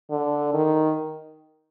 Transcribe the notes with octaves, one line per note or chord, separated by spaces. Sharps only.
D3
D#3